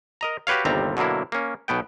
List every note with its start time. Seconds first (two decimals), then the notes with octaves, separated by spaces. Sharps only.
0.21 A#4 D#5 A#5
0.47 F#4 G4 B4 C#5 F5
0.65 G1 D#2 C3 G3 C4 A#5
0.97 B2 D3 F#3 A#3 E4
1.32 A#3 C#4
1.68 B1 B2 B3 G5